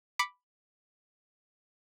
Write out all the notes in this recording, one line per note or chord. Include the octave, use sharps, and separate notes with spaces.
B5 D6 B6 C#7